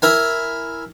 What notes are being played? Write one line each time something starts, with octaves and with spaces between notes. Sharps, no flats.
E4 A#4 G#5